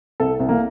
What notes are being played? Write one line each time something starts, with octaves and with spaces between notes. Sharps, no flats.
C2 A4
C2
A#3